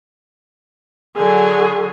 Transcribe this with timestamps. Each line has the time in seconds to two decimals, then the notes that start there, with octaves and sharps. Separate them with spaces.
1.16 D3 F#3 G#4 G#5